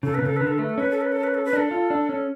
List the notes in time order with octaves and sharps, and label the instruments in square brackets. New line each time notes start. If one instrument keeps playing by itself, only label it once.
[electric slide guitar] C#3 [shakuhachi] A4
[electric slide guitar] B2 [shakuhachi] B4
[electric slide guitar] C#3 [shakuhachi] A4
[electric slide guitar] D3 [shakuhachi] B4
[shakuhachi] A4
[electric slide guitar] A3 [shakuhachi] B4
[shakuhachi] A4
[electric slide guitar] C#4 [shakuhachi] B4
[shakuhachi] A4
B4
A4
B4
A4
B4
[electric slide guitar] D4 [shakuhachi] A4
[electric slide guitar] F4
D4
C#4